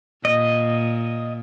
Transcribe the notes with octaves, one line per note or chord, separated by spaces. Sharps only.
A#2 D#5